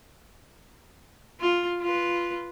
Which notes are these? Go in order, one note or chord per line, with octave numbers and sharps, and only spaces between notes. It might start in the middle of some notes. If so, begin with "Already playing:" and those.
F4
F4 B4